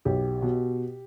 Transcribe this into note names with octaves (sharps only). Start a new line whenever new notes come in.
B1 G4
B2